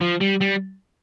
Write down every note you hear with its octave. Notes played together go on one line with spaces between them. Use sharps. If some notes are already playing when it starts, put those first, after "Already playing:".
F3
G3
G3